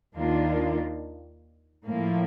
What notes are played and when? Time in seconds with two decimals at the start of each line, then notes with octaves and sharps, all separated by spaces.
0.15 D#2 D#3 A#3 D4 F4
1.86 A2 F3 A#3